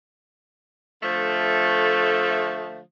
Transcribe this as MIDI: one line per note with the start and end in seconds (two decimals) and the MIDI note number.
1.02 2.80 50
1.02 2.80 53
1.02 2.80 57